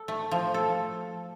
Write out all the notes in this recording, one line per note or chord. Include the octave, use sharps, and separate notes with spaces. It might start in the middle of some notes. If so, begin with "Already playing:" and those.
Already playing: A4
A3
F3
A4